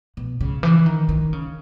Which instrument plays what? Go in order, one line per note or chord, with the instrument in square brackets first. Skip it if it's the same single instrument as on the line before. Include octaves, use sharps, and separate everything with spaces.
[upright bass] B2
C#3
E3
D#3
D#3
C#3